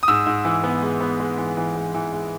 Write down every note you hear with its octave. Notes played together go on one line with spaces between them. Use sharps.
D#6
G#2 E6
G#2
E3
B3
G#3
B3
G#3
E3
E3
G#3
E3
G#3